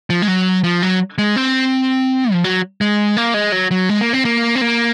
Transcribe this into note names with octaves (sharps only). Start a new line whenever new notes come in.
F3
G#3
F#3
F3
F#3
G#3
C4
F3
F#3
G#3
A#3
G#3
F#3
F#3
G#3
A#3
C4
A#3
C4
A#3